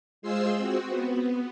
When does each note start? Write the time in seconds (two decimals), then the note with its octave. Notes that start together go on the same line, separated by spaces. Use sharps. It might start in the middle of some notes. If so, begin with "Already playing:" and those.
0.22 G#3 F4 G#4 C5 C6 E6
0.57 C4 F#4
0.88 B3